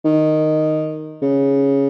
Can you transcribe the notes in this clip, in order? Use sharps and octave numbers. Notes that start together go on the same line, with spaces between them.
D#3
C#3